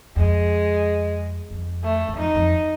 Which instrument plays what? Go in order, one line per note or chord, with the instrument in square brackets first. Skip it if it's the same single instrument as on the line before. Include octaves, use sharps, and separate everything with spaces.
[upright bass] F2 [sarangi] G#3
[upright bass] F2
[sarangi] A3
[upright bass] F#2
[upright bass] F2 [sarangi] D#4
[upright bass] F2